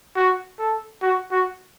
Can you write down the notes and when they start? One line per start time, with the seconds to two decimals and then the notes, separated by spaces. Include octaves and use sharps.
0.16 F#4
0.59 A4
1.02 F#4
1.31 F#4